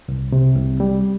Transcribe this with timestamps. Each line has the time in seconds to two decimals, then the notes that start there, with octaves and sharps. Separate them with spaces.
0.08 C2
0.32 C3
0.56 C2
0.80 G3